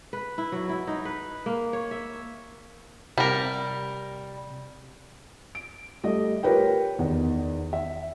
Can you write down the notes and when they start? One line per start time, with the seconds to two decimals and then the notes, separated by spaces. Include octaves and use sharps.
0.13 B4
0.38 E4
0.52 F#3
0.69 E4
0.87 D#4
1.05 B4
1.46 A#3
1.73 C#5
1.91 E5
3.18 C3 G3 A#4
5.55 D7
6.03 G3 A3 D#5
6.43 F4 G4 A#4 B4 C#5 G5
6.99 E2 D#3
7.73 E5